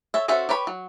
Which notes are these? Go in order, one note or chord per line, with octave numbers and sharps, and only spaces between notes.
A4 C#5 E5
C#4 F#4 A4 C5 E5
G4 B4 C#5 B5
F#3